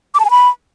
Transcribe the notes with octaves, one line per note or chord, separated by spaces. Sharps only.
D6
A5
G#5
B5